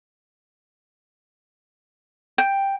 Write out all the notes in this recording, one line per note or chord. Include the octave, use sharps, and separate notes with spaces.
G5